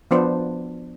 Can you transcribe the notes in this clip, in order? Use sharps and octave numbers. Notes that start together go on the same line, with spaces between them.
F3 B3 D4 C5